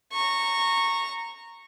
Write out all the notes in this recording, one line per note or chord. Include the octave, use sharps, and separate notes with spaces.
A#5 C#6